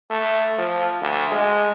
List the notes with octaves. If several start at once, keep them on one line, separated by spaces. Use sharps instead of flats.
A3
F3
D2
G#3